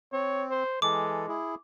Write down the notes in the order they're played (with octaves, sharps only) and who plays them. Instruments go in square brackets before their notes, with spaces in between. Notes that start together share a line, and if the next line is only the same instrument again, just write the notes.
[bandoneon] C4 [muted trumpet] C#5
[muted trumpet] C5
[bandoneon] E3 A4 [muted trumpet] G#3 [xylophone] D6
[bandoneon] E4 G#4